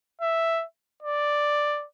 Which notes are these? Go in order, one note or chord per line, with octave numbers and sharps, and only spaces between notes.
E5
D5